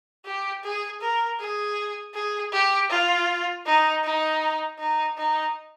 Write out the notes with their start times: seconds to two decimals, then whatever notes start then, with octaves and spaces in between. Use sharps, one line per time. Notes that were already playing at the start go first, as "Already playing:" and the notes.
0.25 G4
0.63 G#4
1.01 A#4
1.40 G#4
2.14 G#4
2.53 G4
2.90 F4
3.65 D#4
4.04 D#4
4.79 D#4
5.17 D#4